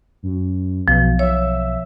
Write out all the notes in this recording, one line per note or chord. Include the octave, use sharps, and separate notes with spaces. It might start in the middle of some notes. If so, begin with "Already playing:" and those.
F#2
B1 B2 F3
C#5 E5